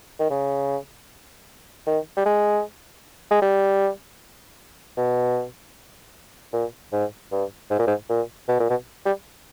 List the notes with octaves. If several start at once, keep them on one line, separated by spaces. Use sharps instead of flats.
D#3
C#3
D#3
G3
G#3
G#3
G3
B2
A#2
G#2
G2
G#2
A#2
G#2
A#2
B2
A#2
B2
G3